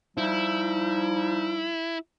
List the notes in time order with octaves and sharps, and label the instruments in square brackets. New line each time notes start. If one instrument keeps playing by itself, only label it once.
[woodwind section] F3 G3 D#4 [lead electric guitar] E4